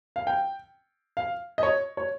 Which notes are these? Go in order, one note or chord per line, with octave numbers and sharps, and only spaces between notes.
F5
G5
F5
D#5
C#5
C#5